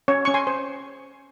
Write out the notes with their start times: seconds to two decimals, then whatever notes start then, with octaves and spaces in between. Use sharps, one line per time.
0.08 C#4 C#5
0.25 C#4 C#6
0.34 G#5 C6
0.47 C5